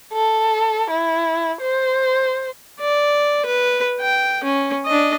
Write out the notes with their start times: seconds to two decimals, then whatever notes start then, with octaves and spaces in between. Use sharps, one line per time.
0.13 A4
0.90 E4
1.61 C5
2.80 D5
3.45 B4
4.00 G5
4.44 C#4
4.86 D4 D#5